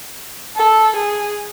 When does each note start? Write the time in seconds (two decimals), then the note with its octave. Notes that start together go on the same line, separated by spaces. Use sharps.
0.56 A4
0.96 G#4